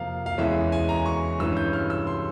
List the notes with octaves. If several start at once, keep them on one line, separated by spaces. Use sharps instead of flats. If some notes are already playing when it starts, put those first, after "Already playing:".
Already playing: F2 C3 F3 A#3 F5
F5
E2 E3 G#3 C#4 E5
G#5
A#5
C#6
G2 E3 G#3 C#4 E6
G6
F6
E6
C6